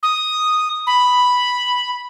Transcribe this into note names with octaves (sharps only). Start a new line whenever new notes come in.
D#6
B5